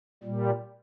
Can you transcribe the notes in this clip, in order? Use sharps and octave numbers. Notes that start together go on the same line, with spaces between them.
A#2 G3